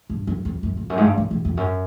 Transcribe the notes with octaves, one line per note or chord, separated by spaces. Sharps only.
G2
F#2
F2
F#2
F2
F#2
G#2
G2
F#2
E2
F2
F#2